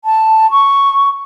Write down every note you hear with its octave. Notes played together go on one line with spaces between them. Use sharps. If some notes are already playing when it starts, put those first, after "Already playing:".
A5
C#6